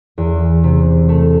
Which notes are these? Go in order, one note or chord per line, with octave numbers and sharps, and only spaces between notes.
E2
C3
A3